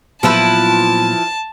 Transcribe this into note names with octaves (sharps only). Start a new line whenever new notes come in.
A#2 F3 F#3 B3 E4 B4 A5